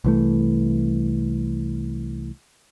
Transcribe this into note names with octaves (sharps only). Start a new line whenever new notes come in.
C2 E3 A3